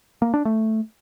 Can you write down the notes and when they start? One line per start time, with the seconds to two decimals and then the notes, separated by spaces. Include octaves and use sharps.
0.22 A#3
0.34 D4
0.45 A3